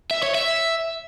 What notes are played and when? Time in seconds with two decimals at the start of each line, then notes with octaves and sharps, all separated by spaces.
0.11 E5
0.23 C#5
0.35 E5